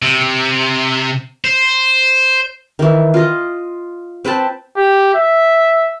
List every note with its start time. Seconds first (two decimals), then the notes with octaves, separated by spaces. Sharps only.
0.02 C3
1.44 C5
2.79 D#3 E3
3.14 F4 D#5
4.25 C4 B4 G5 A5
4.77 G4
5.14 E5